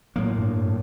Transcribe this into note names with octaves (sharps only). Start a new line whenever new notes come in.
A2 F#3 A#3
G2